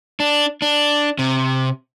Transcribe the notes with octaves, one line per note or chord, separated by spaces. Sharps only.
D4
D4
C3